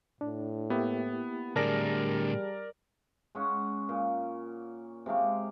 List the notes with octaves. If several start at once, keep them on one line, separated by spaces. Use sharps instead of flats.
A2 D4
A#3 B3 E4 G4
A2 D3 G3 G#4 A#4 D5 A5 A#6
G#3 C#4 F#5
A#2
C3 G#3 F5 D6